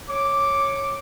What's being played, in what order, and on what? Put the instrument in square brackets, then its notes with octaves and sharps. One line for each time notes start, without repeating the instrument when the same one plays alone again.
[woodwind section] C#5 D6